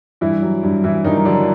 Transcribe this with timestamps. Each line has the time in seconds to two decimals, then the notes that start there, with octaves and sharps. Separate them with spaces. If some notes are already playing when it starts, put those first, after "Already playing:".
0.21 G2 E3 E4
0.42 F#3
0.63 G2
0.84 G2 E3 E4
1.04 G2 D#3 D#4
1.17 D#4
1.25 D3 F#3 D4